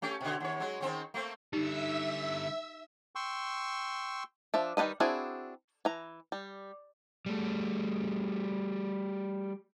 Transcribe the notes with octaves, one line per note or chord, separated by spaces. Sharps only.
A3 C#4 G4
B2 D3
D#2 C#5
F#3 G#3
D#3 C4 C#4
A3 A#3 C4
D3 G3 D#4 G4 E5 E6
G5 C6 C#6 E6
F3 D4 E5
D#3 G3 D4 B4 D#5
C4 D4 E4 F#4 G#4
E3 A#5
G3
G3 A3